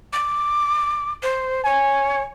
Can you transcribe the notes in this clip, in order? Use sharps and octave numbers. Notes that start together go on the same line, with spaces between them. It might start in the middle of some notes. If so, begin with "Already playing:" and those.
D6
C5
C#5 G#5